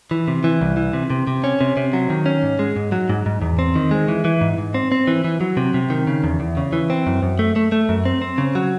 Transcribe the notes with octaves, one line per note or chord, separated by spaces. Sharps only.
E3
C3
E3
C2
E3
C3
C3
C3
C#4
C3
C3
F#3
D#3
C#4
G#2
G#3
G#2
F#3
G#2
G#2
E2
C4
D#3
G#3
E3
E3
G#2
G#2
C4
C4
E3
E3
F#3
C3
C3
D#3
C#3
E2
E2
C#3
E3
C4
F#2
F#2
A3
A3
A3
F#2
C4
C4
C#3
F#3